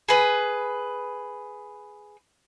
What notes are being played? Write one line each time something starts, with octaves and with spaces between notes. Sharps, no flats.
G#4 B4